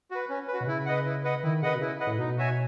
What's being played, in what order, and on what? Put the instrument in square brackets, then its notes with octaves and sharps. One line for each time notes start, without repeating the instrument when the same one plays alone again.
[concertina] F#4 B4
C#4
B4
F#4
[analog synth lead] B2
[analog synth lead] C#3 [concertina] E4
[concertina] B4 D#5 F#5
E4
B4 D#5 F#5
[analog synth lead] D#3 [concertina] E4
[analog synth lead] C#3 [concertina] B4 D#5 F#5
[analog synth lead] B2
[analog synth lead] C#3 [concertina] E4
[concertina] B4 D#5 F#5
[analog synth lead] A2
[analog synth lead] B2 [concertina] D#4
[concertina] F#4 C#5 E5 G#5